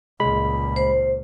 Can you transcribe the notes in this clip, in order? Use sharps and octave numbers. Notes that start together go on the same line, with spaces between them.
C#2 A#2 G#3 B5
C5